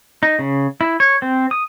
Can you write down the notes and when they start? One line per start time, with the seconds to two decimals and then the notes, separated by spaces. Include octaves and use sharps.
0.23 D#4
0.39 C#3
0.81 E4
1.00 C#5
1.22 C4
1.51 D#6